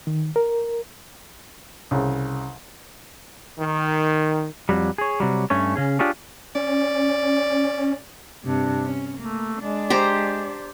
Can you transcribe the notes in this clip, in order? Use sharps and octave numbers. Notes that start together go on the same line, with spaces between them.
D#3
A#4
C2 C#3
D#3
F2 C3 F#3 G3
G#4 C#5
C3 F#3 G3
G2 A3 C#4 C#5
C#3 C#4 G#4
D4 F4 G4 G#4 C#5
C#4 D5
G2 C3 D4
C#4
A3 A#3
G#3 D4
G4 C5 A#5